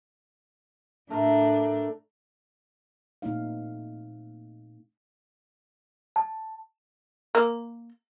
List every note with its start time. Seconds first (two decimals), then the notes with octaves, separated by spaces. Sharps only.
1.10 A2 A3 D4 A#4
3.22 A#2 A3 C4 D#4 F5
6.16 A5
7.35 A#3